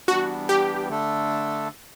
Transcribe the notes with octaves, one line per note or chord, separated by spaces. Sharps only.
E3 G3 B3 D4 F#4
G4
D3 A3 D4 A4